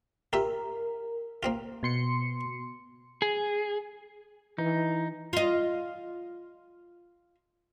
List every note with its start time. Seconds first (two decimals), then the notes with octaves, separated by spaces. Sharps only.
0.33 F4 G4 A#4 E5
1.43 A#3 C4 F4
1.83 B2 C6 C#7
3.22 G#4
4.58 E3 D#4
5.33 F4 D#5